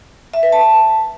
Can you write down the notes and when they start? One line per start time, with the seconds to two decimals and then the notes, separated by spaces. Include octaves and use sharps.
0.34 E5
0.43 B4
0.52 A5